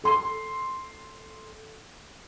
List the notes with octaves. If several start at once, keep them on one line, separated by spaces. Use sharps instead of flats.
A4 C6